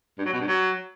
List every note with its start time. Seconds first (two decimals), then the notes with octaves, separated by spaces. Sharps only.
0.18 G2
0.25 F#3
0.33 B2
0.40 G2
0.48 F#3